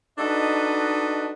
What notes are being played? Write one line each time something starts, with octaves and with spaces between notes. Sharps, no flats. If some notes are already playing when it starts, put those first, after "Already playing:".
D4 D#4 F#4 A4 B4 D#5